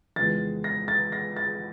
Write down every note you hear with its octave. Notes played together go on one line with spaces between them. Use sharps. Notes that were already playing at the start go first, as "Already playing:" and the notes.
F2 C#3 E3 G#3 B3 A6
A#6
A6
A#6
A6